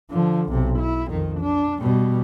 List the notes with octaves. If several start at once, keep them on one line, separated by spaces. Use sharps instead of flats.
D3 F3
B1 C3
E4
F2 D#3
D4
B2 G3